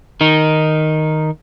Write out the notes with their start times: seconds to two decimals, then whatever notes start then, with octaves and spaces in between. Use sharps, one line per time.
0.21 D#3 D#4